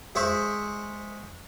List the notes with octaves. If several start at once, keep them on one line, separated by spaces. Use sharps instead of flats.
G#3 G#4 C5 E5 C#6